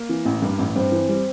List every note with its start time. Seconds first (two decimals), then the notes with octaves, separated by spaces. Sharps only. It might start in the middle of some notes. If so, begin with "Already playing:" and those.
Already playing: A#3
0.09 E3
0.25 A1
0.42 G2
0.59 A1
0.76 G2 C4
0.92 E3
1.09 G3